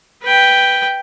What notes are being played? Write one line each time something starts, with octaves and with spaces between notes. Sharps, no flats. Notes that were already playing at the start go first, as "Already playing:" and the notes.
B4 G5